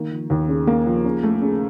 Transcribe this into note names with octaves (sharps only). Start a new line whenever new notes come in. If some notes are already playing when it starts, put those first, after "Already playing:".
Already playing: D#3 A#3
F3
D#2
C#3
A#3
F3
C#3
A3
C#3